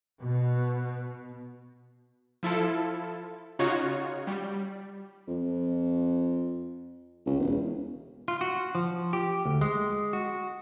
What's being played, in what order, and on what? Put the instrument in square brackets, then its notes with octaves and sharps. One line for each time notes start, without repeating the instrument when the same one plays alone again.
[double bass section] B2
[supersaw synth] F3 E4 F4 A4
C#3 D#4 F4 F#4 C#5
G3
[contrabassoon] F2
C#2
E1
[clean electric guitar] F4
F#4
F3
G4
D2
G#3
F#4